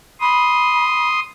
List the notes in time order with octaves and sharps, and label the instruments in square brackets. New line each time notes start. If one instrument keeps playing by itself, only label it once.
[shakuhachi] B5 [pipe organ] C6 D#6